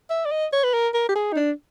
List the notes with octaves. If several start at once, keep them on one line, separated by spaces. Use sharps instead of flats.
E5
D5
D#5
C#5
B4
A#4
A#4
G4
G#4
D#4
D4